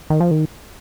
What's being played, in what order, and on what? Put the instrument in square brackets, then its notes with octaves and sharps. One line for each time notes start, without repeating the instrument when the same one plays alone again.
[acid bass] D#3
F3
D#3